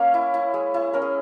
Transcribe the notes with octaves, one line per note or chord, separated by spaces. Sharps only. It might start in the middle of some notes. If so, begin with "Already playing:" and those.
Already playing: A#3 C#4 C#5
E4
E4
G#3
E4
C#4 A#4
G#4